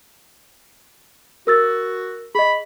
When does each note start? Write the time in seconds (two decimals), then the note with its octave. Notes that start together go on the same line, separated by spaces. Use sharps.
1.47 F#4 A#4 E6 A6
2.35 G#4 D#5 B5